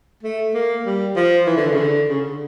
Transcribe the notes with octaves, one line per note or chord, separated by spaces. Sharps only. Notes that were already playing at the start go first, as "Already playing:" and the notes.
A3
A#3
G3
F3
E3
D3
E3
C#3
D3
C#3
D3